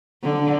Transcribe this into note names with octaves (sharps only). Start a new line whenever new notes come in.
D3